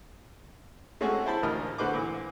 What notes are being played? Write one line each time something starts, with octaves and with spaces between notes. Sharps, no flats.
G#3 A3 C4 C#4 F#4 G#4
E4 C5 A5 B5
A1 D2 F4 A#4 D#5 F6
D3 A3 F#4 B4 C5 D6
A#2 E3